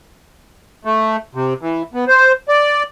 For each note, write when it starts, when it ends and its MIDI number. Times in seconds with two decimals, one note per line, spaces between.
0.85 1.16 57
1.35 1.54 48
1.61 1.82 52
1.94 2.05 59
2.08 2.32 72
2.48 2.83 74